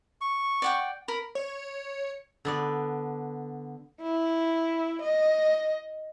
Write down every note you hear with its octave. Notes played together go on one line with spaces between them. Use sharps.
C#6
D5 F#5 G5
A#4 B5
C#5
D3 B3 D5
E4
D#5